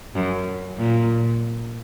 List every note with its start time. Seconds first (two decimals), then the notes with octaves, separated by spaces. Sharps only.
0.15 F#2
0.77 A#2